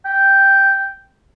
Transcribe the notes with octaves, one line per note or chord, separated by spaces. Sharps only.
G5